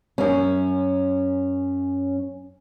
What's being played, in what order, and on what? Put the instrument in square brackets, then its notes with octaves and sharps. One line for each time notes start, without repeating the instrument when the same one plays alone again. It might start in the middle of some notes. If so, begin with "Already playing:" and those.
[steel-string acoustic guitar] F#2 C#4